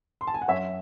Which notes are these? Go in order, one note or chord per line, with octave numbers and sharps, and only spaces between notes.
C6
A5
G#5
F#5
F#2 C#5 E5